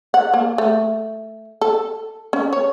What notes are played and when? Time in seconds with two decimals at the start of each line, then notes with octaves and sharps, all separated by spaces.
0.14 F#5
0.34 A#3
0.58 A3
1.61 A4
2.33 C#4
2.53 C#5